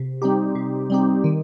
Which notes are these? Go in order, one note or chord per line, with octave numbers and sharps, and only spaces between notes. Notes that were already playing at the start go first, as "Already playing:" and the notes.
Already playing: C3
G3 C4 D#4 G4
C3
G3 C4 D#4 G4
D#3